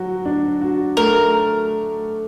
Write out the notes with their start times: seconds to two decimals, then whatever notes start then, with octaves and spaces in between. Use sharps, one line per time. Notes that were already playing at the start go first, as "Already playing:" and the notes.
Already playing: F#3 F#4
0.25 D4
0.61 F#4
0.97 A3 A#4